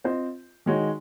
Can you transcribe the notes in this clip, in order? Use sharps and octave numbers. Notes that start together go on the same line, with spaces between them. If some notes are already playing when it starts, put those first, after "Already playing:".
C4 F4 C5 D#5
D#3 G#3 D#4 F#4 C#5